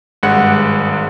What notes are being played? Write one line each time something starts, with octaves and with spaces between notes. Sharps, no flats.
G#1 G2 G#3 F#5 F#6 C#7